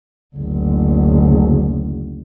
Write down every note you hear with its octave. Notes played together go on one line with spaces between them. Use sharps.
F#1 D2